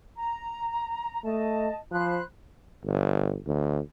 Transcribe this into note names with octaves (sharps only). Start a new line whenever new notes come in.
A#5
A3 D#5 A5
F3 C5 B5 F#6
G1
D2